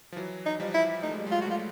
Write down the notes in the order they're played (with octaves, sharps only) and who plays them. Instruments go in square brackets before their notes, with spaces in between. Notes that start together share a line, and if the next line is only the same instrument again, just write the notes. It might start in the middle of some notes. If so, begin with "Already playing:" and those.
[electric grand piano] F3
E3 F#3
[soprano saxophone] D#4
[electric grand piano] F3 G3
[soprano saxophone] E4
[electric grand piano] A3 [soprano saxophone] D#4
[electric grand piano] G#3
G3
F#3 G#3
[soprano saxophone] F4
F#4
[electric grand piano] G3 A3 [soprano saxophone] F4